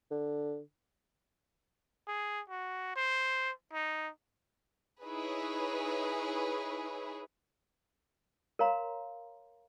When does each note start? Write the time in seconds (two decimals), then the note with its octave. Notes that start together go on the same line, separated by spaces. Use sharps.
0.11 D3
2.07 G#4
2.50 F#4
2.96 C5
3.73 D#4
5.03 D#4 E4 G#4 B4 C#5
8.59 A#4 C#5 F5 A#5 C6